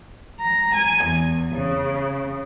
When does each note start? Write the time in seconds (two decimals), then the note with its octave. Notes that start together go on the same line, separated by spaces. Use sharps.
0.40 A#5
0.76 G#5
1.05 E2
1.55 C#3